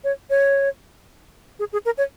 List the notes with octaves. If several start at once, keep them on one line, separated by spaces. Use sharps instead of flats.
C#5
C#5
G#4
G#4
A#4
C#5